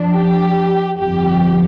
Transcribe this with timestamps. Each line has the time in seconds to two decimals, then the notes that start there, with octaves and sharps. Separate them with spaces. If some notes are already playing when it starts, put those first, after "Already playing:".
Already playing: F2 F3 D4
0.14 G4
0.99 G1 F2 F3 G4